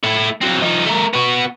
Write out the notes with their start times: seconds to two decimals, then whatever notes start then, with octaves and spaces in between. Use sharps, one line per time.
0.04 A3 E4
0.41 F#3 C4
0.62 F3 D#4
0.86 A3 A#4
1.13 B3 F#4